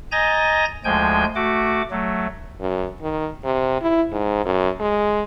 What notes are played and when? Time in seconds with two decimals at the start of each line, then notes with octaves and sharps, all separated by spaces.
0.12 D#5 G#5 A#5 G6 A6 A#6
0.84 D2 F3 G#3 G5 G#5 G6
1.35 A3 F#4 D6
1.91 F#3 A3
2.61 F#2
3.01 D#3
3.44 C3
3.82 E4
4.12 G#2
4.46 F#2
4.80 G#3